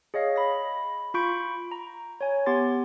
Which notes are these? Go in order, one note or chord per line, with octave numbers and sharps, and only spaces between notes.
G#4 C#5 D#5 F5
B5 A#6
F4 B5 C#6 G6 D7
A#5
C#5 G#5
B3 G4 C6 A6